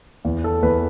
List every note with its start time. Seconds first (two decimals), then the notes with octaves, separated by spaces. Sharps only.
0.25 E2
0.44 A4
0.63 E2 B4